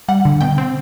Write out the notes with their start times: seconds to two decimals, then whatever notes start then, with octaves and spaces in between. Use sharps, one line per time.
0.08 G3 F#5
0.25 D3
0.41 B2 G5
0.58 C4